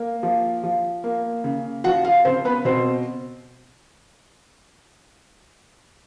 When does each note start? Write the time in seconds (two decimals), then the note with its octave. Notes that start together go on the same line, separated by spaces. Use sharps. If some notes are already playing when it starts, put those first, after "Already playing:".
Already playing: A#3
0.23 F3
0.63 F3
1.04 A#3
1.44 C#3
1.84 F3 F#4 F#5
2.05 F4 F5
2.25 C#3 C4 C5
2.45 B3 B4
2.65 B2 C4 C5